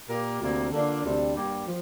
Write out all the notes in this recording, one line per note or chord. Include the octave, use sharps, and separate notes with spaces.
A#2 A#3 G4 A#4
D2 C3 A#3 D4
D3 A#3 D4 F4
D2 C3 G3 D4
G2 G3 A#3 G4
F3